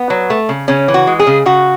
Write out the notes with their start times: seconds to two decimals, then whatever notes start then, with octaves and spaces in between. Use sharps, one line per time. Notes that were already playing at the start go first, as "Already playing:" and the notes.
Already playing: B3
0.10 F#3
0.30 A3
0.49 C#3
0.68 C#3 C#4
0.88 E3
0.94 F#4
1.07 G#3
1.19 G#4
1.27 C#3
1.46 C#3 F#4